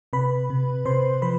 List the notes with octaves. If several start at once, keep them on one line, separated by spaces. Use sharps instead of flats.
C3 B4 B5
C3
C3 C5 C6
F3 B4 B5